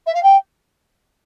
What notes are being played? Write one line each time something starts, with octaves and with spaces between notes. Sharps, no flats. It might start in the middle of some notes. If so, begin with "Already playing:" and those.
E5
F5
G5